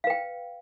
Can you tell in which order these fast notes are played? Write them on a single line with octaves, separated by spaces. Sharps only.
F5 B4 G5